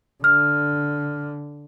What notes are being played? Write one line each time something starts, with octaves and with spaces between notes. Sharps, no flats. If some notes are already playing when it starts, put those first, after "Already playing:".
D3 F6